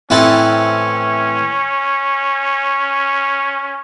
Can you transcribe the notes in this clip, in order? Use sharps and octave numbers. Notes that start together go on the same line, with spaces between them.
A2 E3 C4 C#4 E4 A4